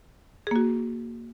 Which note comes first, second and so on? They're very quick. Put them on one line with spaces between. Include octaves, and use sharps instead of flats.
G#4 A#3 F#4